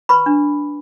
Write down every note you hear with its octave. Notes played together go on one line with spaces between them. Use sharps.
B4 B5 C#6
D4